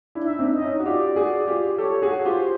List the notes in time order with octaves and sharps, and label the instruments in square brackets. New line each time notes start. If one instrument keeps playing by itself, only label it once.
[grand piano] D4 E4
[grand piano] D#4 [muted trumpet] E5
[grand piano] C4 D4
[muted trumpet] D#5
[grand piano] C#4 D#4
F#4
[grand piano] F4 G4 [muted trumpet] D5
[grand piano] F#4 G#4
F4 G4
[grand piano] G4 A4 [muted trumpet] C#5
[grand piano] F#4 G#4
F#4
[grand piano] F4 G4 [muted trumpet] C5